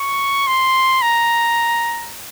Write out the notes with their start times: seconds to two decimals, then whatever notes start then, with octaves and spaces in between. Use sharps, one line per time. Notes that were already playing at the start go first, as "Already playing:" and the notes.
Already playing: C#6
0.47 C6
1.02 A#5